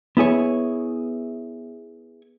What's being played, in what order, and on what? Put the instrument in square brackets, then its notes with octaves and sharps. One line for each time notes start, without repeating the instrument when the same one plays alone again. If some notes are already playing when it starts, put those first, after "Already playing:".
[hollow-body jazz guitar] B3 E4 G#4 C#5